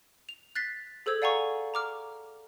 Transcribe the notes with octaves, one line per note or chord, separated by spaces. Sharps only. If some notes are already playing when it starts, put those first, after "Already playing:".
F7
F#6 A6 B6 C7
G#4 A4 C5 E6 G#6
D5 F5 F#5 G#5 A#5 C#6
A#5 D6 F6